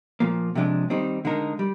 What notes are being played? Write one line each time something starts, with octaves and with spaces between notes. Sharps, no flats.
A#2 F3 A#3
C3 F3 G#3 D4
D#3 G3 C4 D#4
D3 G#3 D#4 A#4
G3